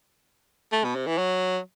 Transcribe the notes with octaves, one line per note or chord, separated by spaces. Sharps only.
A3
B2
C3
E3
F#3